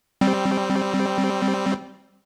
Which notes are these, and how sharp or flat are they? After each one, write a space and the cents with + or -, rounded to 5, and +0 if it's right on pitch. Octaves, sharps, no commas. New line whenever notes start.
G3 -10 C4 +0